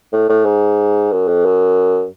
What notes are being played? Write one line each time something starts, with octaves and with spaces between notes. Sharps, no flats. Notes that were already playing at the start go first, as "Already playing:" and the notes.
A2
A2
G#2
F#2
F2
F#2